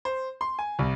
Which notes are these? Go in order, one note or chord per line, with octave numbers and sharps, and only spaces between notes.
C5
C6
G#5
C2